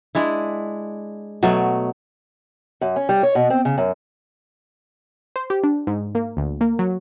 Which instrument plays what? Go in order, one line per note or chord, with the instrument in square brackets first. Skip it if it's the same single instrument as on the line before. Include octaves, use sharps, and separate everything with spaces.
[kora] G#3 D4 E4
B2 F#3 A3
[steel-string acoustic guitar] F#2
C#4
G3
C#5
B2
C4
C#3
F#2
[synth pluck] C5
G4
D4
G#2
A#3
D2
A#3
F#3